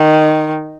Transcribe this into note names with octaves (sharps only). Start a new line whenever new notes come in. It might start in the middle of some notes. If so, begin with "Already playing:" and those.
Already playing: D#3